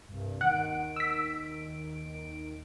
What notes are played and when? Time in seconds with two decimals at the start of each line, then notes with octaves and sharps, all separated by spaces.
0.08 C2 G2
0.41 D#2 D#3 F#5 D7
0.96 E6 B6